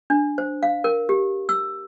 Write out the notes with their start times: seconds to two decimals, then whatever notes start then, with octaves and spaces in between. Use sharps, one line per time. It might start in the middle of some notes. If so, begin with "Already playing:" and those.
0.10 D4
0.38 C5
0.63 F5
0.84 A#4
1.09 G4
1.49 E6